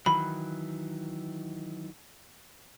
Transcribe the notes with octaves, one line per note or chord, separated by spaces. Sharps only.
D#3 E3 F#3 B5